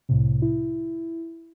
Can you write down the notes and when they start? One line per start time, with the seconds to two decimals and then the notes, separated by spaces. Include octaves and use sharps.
0.09 C2 A2 C3
0.42 E4